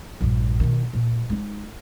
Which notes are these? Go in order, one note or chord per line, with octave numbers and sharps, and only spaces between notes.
A#1 G2
B2 D#3
A#2
G#3 D#4